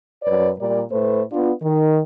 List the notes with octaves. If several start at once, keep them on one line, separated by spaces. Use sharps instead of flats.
F#2 B4 C#5 D5
A#2 G3 A#4 D5
A2 A3 B4 C5
B3 D4 F4
D#3